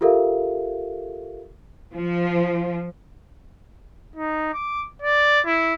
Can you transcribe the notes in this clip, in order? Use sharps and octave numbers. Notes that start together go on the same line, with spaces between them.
F4 G4 A4 A#4 E5 F5
F3
D#4
D6
D5
E4